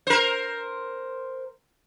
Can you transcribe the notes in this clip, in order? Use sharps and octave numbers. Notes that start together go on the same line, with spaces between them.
A#4 C5